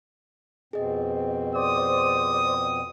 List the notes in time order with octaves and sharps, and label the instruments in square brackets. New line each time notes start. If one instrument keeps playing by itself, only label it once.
[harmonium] F2 B2 C4 [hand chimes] G#4 D#5
[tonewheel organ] C5 D5 [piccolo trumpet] D#6